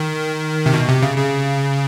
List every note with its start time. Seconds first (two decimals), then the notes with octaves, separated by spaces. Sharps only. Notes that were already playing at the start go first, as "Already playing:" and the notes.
Already playing: D#3
0.66 C3
0.73 B2
0.88 C3
1.02 C#3
1.18 C#3